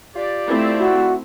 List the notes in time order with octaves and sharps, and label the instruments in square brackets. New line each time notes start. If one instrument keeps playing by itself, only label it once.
[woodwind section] F4 G4 D5
[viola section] A3 C4 E4
[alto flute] F#4